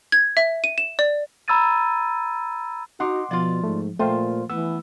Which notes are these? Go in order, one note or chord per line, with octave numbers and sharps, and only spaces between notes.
G#6
E5
D#7
E7
D5
A#5 B5 E6 G#6 A6 D#7
D#4 F#4 F#5 C6 D6
B2 F3 F4 D5
G#2 A3
A#2 A3 F4 C5 F5 G5
E3 A3 B3 E6